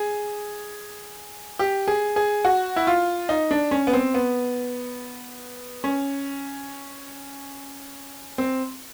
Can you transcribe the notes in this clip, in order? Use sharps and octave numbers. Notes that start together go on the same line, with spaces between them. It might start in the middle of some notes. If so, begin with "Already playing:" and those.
Already playing: G#4
G4
G#4
G#4
F#4
E4
F4
D#4
D4
C#4
B3
C4
B3
C#4
C4